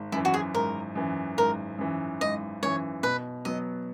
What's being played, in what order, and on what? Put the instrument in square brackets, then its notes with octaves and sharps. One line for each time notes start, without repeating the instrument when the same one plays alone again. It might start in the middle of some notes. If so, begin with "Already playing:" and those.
Already playing: [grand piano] G#1
[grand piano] F#2 E3 [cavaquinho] E4
[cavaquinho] F#4
G#4
[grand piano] G#1 [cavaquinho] A#4
[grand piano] F#2 E3
[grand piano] G#1 [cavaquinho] A#4
[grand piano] F#2 E3
[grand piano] G#1 [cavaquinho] D#5
[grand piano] F#2 E3 [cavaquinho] C#5
[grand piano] B2 [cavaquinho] B4
[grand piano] F#3 B3 [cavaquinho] D#5